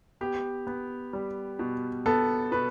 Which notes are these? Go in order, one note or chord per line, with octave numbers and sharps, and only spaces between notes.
B3 G4
B3
G3
B2
B3 A4
B2 B4